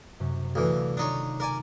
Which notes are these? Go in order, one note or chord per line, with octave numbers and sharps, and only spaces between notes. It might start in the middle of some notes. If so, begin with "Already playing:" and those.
F#2 C3 C#4
D2 E3 A3 D5 F5
D#3 D4 D#4 F4 C#5
A#4 D5 G#5